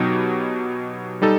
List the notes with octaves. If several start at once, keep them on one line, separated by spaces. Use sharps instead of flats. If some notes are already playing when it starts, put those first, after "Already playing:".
Already playing: B2 F#3 B3 D#4 G4
G3 D#4 A4